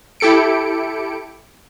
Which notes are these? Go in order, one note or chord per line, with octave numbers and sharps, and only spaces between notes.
E4 G4 A4 C#7 D7